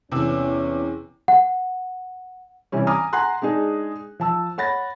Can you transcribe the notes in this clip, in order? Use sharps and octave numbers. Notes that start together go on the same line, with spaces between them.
E2 C3 E3 C#4 E6
F#5
C3 E3 G3 C#4
G#5 A#5 D6 D#6 F6
F#5 G#5 A#5 C6 F#6
G#3 D4 D#4 G#4
F3 A5 E6
C#5 F#5 B5 A6 A#6